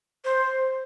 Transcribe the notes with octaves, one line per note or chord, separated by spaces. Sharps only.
C5